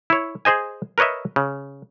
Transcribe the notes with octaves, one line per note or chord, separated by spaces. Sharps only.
E4 C#5
G#4 C5 D#5 G#5
A#4 B4 C#5 D#5 E5
C#3